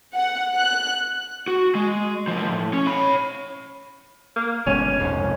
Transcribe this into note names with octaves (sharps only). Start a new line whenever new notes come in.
F#5
F#6
F#4
G#3
B1 F3
A2
C#4
C#5 B5
A#3
G1 B2 G#3 C#4
C2 F2 G#2